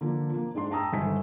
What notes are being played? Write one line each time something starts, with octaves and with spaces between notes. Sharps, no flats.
D3 F3 A#3 D4
F3 A#3
G#2 G#3 D4 C6
G5 A5 A#5 D#6 E6
G1 G#2 D#3 G#5 B6